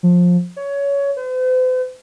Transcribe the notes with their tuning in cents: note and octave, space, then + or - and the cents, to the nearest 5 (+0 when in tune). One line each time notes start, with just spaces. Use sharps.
F3 +20
C#5 +20
C5 -45